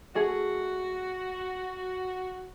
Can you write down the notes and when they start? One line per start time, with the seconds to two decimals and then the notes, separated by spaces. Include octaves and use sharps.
0.15 A3 F#4 G#4